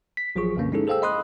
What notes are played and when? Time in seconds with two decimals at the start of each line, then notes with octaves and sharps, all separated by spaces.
0.17 B6
0.35 A1 F3 F#3 F4 G#4 C#6
0.56 C#2 G2 B2 D3 A#3 C#4
0.72 G#3 C#4 D#4 E4 G#4 A4
0.87 G#4 A4 C5 F5 G5 E6
1.02 D#5 B5 C6 D#6 F#6